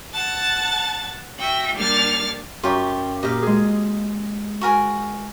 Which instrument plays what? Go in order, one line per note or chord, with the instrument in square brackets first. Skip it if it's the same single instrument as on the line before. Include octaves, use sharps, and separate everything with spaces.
[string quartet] F#5 A5 A6
F#4 E5 G5
G3 A#3 D4 F6 A6
[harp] F#2 [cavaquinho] F4 G4 C#6
[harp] A#2 G4 [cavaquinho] D#5 F5
[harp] G#3 G#4
[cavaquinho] F#4 A#4 G#5